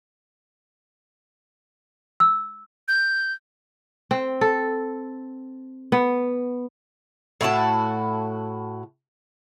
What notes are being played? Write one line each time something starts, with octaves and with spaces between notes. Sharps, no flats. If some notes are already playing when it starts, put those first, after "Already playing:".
E6
G6
C4
A4
B3
A2 E4 F#4 A5